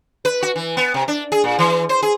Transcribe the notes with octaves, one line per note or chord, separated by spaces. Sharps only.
B4
F#4
E3
B3
C3
D4
G#4
A#2
E3
C5
G#4